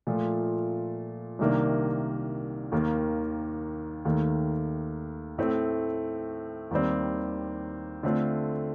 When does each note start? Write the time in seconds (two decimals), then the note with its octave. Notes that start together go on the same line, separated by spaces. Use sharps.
0.07 A#2 F3 A3
1.39 C2 C3 D#3 A#3 D4
2.72 D#2 D#3 A#3
4.05 D#2 D#3 A3
5.38 A2 A3 C4
6.71 D#2 D#3 G3 C4
8.03 D3 A3 C4 F4